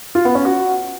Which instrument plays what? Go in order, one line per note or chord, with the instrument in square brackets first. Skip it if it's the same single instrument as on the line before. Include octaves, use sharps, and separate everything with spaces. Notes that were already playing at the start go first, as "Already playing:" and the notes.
[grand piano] F4
B3
C#4
F#4